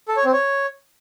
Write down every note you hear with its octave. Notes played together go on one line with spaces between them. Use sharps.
A4
C#5
C4
C#5